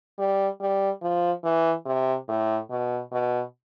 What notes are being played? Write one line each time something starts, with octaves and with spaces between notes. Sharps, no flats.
G3
G3
F3
E3
C3
A2
B2
B2